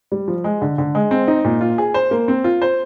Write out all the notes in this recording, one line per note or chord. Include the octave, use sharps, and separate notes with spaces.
G3
F3
G#3
D3
D3
G#3
C4
D#4
A#2
F4
G#4
C5
A#3
C4
F4
C5